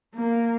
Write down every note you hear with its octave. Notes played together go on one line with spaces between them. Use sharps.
A#3